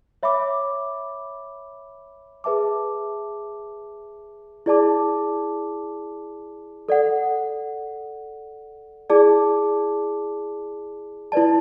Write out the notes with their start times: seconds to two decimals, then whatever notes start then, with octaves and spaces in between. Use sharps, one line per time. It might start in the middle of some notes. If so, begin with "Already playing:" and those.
0.23 C#5 E5 B5 D6
2.44 G#4 B4 E5 A5 D6
4.66 E4 G#4 D5 A5 D6
6.89 A4 D5 F#5
9.10 E4 G#4 D5 A5 D6
11.32 E4 B4 D5 A5